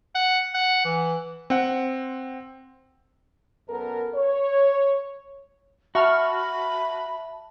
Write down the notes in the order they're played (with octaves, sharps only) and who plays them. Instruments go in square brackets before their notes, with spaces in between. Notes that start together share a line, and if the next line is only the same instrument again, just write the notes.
[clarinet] F#5
F#5
E3
[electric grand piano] C4 F#5
[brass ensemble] F#2 B3 A4 A#4
C#5
[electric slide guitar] F#4 [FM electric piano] E5 A5 [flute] B5 [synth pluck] C#6 F6